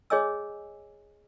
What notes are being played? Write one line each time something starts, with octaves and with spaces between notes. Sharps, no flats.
G#4 C#5 D#5 G#5 E6